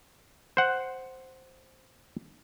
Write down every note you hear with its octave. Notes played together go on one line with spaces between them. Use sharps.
C5 F#5